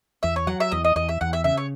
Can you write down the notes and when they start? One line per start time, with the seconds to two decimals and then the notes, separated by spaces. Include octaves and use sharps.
0.23 E2 E5
0.36 C#5
0.47 F#3 F#5
0.60 E5
0.72 E2 D#5
0.84 D#5
0.96 E2 D#5
1.09 E5
1.21 E2 F#5
1.33 E5
1.44 C#3 E5
1.57 C#5